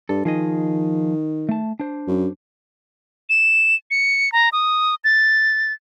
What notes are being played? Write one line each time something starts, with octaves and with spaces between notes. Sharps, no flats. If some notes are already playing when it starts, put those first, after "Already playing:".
G2 A4
D#3 F3 G#4 D#5
A3 A5
D4 C5
F#2
E7
C#7
A#5
D#6
A6